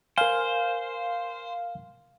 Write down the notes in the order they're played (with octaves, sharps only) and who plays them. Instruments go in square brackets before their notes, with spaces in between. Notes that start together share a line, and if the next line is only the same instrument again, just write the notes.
[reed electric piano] A#4 G#5 [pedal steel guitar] C5 [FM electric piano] F5